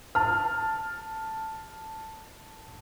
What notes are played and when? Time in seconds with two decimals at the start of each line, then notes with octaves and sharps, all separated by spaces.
0.15 A5 F6